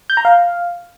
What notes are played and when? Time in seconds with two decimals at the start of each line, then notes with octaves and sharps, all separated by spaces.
0.10 G6
0.17 A#5
0.25 F5